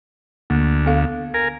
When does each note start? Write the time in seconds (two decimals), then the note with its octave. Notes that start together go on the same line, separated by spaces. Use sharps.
0.50 D2 A#3
0.86 B3 A4 F5
1.34 A#4 G#5